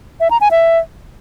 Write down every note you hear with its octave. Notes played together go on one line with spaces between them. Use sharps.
E5
A#5
G#5
E5